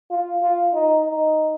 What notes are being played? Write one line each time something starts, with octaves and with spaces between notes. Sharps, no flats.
F4
F4
D#4
D#4